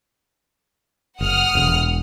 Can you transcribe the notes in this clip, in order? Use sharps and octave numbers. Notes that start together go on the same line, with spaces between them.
F#1 F#5 D#6 F6
E1